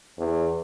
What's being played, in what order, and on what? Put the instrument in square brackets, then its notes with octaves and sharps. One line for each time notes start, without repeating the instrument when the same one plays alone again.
[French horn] E2